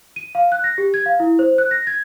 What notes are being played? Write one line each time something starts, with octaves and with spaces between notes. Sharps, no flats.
D#7
F5
F#6
A#6
G4
G#6
F5
E4
C5
F#6
A#6
G#6